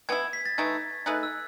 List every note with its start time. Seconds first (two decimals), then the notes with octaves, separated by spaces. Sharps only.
0.09 E3 B3 E4 G#6
0.33 B6
0.46 A6
0.58 E3 A3 D#4 G#6
1.06 A3 D#4 G#4 B4 F#6
1.23 E6